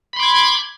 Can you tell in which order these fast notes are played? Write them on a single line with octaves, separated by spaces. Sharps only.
B5 C6 D6 G#6